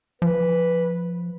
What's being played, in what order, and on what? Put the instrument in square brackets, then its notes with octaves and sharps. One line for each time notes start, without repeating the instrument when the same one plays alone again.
[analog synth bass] F3 [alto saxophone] B4